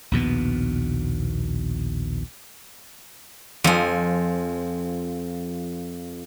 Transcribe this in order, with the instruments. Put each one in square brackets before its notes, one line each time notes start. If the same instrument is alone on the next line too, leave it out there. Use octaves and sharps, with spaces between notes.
[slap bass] A#1 D#2 B2 B3
[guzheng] F2 [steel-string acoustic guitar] F3 G#5